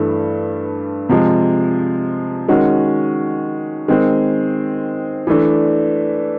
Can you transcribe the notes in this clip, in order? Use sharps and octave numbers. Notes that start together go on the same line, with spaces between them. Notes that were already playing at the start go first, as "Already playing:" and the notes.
Already playing: G2 E3 A3
C3 F3 G#3
D#3 G#3 C#4 F#4
D#3 G#3 C4
E3 A3 D4